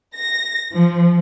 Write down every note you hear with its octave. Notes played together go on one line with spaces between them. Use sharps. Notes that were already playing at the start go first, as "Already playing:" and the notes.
A#6
F3